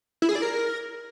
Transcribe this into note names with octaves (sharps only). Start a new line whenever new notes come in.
E4
G#4
D5
A#4